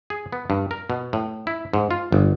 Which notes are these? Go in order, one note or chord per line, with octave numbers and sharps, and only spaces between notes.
G#4
B3
G2
A#4
B2
A2
E4
G#2
F4
G1